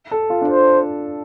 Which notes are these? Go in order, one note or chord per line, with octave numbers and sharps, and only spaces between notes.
A4
F4
D4
F4 C5